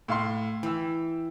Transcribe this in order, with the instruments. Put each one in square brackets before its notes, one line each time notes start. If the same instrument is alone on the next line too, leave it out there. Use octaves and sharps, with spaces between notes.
[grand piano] A2 F5 C6
[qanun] E3 [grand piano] G5 E6